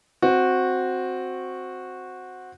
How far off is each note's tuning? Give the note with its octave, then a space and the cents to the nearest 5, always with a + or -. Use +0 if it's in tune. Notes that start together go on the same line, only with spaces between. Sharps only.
C4 +0 F#4 -10